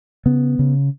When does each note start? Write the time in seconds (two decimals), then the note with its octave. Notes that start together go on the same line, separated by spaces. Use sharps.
0.26 C#3 B3
0.59 C#3